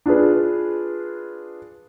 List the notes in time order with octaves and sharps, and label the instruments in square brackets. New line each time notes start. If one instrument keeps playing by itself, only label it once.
[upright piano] D4 F4 G#4 B4